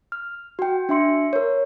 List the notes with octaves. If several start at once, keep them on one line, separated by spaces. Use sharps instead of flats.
F6
F#4 G5
D4 E5 C6 C#7
A#4 C#5